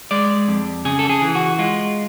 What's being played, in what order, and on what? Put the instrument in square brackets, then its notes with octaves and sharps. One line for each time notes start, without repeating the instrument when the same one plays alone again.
[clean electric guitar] G#3 D5
F2
C#3 G#4
A4
G#4
E3
F#4
G#3 F4